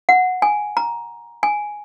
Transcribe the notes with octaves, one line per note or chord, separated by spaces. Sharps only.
F#5
G#5
A#5
G#5